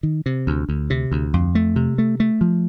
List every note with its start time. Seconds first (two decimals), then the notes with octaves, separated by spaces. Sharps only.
0.03 D#3
0.26 C3
0.47 D2
0.69 D2
0.90 C3
1.11 D2
1.34 F2
1.55 A3
1.76 C3
1.98 A3
2.20 A3
2.41 F3